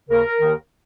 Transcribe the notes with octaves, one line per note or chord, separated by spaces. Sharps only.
D#2 C#3 A#4
D#2 D#3